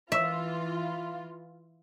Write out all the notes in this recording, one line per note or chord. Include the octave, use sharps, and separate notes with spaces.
E3 F4 E5